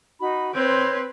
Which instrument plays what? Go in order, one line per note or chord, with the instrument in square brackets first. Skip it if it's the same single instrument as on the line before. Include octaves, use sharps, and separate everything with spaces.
[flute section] D#4 F#4 B5
[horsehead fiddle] C4 B4 [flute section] C#5 C6 G6